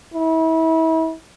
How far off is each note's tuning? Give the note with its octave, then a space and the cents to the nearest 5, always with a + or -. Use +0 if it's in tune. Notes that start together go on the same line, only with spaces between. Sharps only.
E4 -35